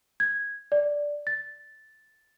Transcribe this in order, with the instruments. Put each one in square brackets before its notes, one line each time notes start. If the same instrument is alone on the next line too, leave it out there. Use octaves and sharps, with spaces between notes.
[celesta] G#6
D5
A6